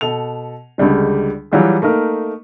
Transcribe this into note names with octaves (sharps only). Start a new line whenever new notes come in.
B2 A4 F7
C#2 D3 G3 G#3
E3 F#3 G3 F4 G#4
A3 A#3 D#4 A#4